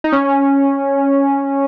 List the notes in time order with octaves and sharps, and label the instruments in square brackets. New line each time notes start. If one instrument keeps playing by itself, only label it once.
[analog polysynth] D#4
C#4